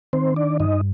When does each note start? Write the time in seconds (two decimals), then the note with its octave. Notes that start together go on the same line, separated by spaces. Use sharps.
0.13 D#3 C4 C5
0.36 D4 D5
0.60 G2 D#4 D#5